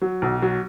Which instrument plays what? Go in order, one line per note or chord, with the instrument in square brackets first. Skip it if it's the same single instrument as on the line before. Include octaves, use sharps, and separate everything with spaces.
[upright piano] F#3
B1
F#3